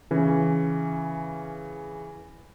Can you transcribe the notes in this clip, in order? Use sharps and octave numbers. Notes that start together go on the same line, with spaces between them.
C#3 E3 C#4